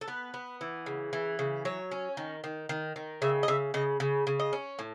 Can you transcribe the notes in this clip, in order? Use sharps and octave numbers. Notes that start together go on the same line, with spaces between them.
A4
B3 B4
B3
E3
C#3
E3
C#3
F#3 C#5
C#4
D#3
D#3
D#3
D#3
C#3 E5
D#5
C#3 E5
C#3 D#5
C#3
C#3
D#5
C#4
A2